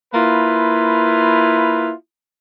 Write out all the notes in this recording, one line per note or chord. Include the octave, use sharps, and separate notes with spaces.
A#3 E4 F4 B4